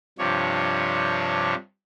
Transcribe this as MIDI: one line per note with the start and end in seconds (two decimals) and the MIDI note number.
0.19 1.55 43
0.19 1.55 48
0.19 1.55 53
0.19 1.55 62
0.19 1.55 73